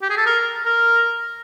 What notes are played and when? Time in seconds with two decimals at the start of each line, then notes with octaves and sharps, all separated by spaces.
0.02 G4
0.10 G#4
0.17 A4
0.26 A#4
0.66 A#4